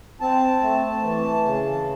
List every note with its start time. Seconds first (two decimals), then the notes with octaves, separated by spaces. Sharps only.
0.21 C4 A5
0.62 A3
1.03 E3
1.44 C#3